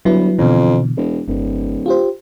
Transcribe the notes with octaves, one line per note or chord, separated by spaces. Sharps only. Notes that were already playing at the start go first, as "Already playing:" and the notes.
G1 F#3 E4 B4
F2 B2 D3 E3
E1
D1 G1
F4 G4 C5